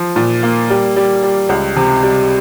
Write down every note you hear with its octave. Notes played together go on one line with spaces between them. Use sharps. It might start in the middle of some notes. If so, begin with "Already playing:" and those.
Already playing: F3
A#2
A#3
G3
G3
G3
C#2
C3
G3